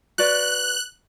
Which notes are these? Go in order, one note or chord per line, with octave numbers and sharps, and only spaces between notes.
F#4 B4 D5 F#6